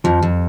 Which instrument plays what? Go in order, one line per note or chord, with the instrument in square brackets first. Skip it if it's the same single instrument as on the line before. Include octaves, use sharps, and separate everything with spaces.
[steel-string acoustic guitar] F2 [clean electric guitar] F3
[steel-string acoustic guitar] F2